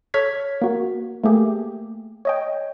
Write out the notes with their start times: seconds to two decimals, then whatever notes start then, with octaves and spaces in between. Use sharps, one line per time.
0.14 A4 C#5 F6 G#6 B6
0.62 A#3 F#4
1.24 A3 A#3 G4 G#4
2.25 C#5 D#5 G5